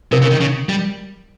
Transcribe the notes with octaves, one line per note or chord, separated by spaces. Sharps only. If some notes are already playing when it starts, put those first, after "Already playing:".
C3 A#4
C#3
D#3
C#3
G3